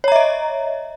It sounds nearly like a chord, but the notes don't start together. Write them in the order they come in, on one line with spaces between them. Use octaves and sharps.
C#5 A#5 E5 D#5